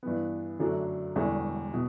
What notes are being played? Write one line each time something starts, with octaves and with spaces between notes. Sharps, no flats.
G2 E3 B3
F#2 D3 F#3 A3 D4
E1 E2 D3 G3 C#4
B2